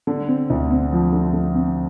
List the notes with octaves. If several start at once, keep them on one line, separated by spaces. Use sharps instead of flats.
D3
C4
D2
C4
F3
D3
D3
C4